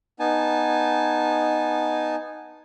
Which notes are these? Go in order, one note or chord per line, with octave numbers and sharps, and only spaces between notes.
B3 D#4 G#5 A5